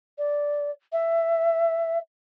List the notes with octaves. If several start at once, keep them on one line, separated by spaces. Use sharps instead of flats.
D5
E5